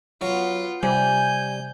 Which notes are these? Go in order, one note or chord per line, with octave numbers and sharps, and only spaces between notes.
F#3 B3 F4
C3 G3 G#5 G6